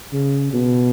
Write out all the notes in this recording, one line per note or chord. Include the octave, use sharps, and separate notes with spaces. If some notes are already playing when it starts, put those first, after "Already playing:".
C#3
B2